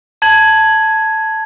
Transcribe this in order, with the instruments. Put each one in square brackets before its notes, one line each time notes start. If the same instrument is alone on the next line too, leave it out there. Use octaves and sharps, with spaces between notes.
[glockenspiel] A5 G#6 F#7